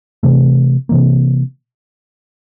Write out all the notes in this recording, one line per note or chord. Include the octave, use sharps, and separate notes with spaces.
C3 E3 A3
C3 E3 A#3